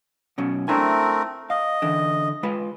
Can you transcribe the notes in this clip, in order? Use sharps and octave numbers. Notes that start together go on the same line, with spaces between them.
B2 F#3 C#4
A3 C4 D4 E4 A#4 G#5
D#5 F5
D3 E3
G#3 F4 B4